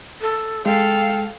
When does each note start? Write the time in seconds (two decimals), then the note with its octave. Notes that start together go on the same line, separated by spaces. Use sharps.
0.21 A4
0.66 G#3 A4 F5 G5